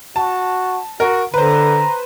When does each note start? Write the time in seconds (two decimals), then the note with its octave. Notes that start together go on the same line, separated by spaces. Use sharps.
0.16 F#4 A5
1.00 F#4 A#4
1.34 D3 B4 C5 A#5